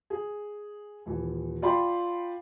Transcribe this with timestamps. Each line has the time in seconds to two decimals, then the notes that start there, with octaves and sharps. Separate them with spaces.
0.10 G#4
1.06 D#1 E3
1.62 F4 D5 G5 B5 C6